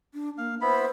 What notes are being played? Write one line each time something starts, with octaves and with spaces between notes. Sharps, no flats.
D4
A#3 F5
B3 E4 C5 B5